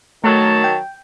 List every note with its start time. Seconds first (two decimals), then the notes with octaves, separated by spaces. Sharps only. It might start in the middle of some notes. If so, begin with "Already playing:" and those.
0.24 D#3 F#3 A3 A5
0.64 G5